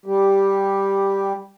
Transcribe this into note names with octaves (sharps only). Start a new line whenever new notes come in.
G3 G4